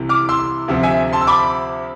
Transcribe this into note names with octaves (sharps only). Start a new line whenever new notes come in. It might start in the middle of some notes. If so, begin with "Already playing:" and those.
Already playing: C2 C3 E3
D6 F6
C6 E6
D2 C3 F3
E5 G#5
A5 C6
E6
B5 D6